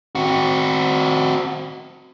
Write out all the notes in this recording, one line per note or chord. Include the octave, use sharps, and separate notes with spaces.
C4 F#4